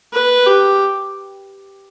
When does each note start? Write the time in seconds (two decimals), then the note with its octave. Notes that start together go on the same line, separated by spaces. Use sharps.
0.13 B4
0.47 G4